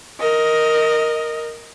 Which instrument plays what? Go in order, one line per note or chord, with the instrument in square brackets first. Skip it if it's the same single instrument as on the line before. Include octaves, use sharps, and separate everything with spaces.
[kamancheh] A#4 D#5